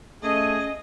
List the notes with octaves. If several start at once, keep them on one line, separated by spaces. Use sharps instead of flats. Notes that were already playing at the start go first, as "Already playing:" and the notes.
A3 C#4 G#4 D#5